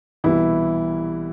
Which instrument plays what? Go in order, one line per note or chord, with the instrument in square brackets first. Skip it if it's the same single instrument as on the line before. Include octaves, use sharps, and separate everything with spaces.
[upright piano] C2 B2 E3 E4